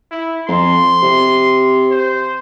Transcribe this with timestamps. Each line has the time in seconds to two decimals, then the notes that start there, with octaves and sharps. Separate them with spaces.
0.12 E4
0.48 F2 C6
1.03 C3
1.91 C5